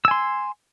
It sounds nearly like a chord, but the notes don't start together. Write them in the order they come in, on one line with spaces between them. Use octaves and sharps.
E6 G#5 C6